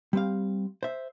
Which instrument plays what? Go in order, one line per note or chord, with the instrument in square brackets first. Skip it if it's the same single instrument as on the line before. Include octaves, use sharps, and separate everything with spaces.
[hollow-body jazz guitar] G3 C4 F5
C5 E5